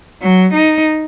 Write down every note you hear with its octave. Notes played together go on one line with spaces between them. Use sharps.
F#3
D#4